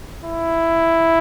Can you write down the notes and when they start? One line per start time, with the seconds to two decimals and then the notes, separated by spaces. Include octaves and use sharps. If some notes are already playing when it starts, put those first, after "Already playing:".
0.25 E4